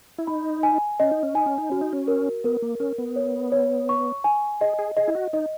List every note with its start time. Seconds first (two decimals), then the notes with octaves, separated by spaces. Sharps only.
0.18 E4
0.27 D#4 B5
0.63 G#5
1.00 C#4 D#5
1.11 D#4
1.23 C#4
1.35 D#4 G#5
1.46 C#4
1.58 D#4
1.70 C#4 F#4
1.81 D#4
1.93 C#4
2.08 A#4
2.44 B3 A#4
2.62 A#3
2.80 C#4 A#4
2.98 B3
3.16 C#5
3.52 C#5
3.89 C#6
4.24 G#5
4.61 G#4 D#5
4.79 G#4
4.97 G#4 D#5
5.08 E4
5.15 F#4
5.33 D#4 D#5